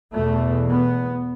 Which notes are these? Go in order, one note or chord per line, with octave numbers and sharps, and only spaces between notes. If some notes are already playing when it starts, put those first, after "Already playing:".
E2 B2 A3
B3